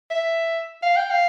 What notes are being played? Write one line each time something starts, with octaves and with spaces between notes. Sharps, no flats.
E5
F5
G5
F5